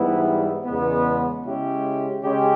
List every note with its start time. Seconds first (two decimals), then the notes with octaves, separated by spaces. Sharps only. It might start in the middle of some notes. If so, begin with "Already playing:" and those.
Already playing: G#2 E3 G3 B3 E4
0.65 E2 C#3 G#3 B3
1.45 C#3 G#3 C#4 E4 G4
2.22 C#3 G#3 C#4 G4